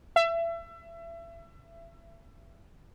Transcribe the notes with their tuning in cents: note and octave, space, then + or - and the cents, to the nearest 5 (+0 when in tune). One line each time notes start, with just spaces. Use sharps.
E5 +30